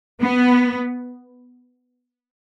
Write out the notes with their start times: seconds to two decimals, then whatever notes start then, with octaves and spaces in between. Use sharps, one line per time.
0.21 B3